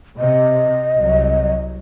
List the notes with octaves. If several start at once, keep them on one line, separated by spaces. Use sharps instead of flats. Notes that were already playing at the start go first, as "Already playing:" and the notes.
C3 D#5
C2 F#3